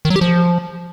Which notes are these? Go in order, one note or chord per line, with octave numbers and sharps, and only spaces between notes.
D#3
F#3
G4
F3